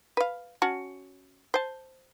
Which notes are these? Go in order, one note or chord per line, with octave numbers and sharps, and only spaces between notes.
B4 F5
C#4 F#4 A5
C5 A5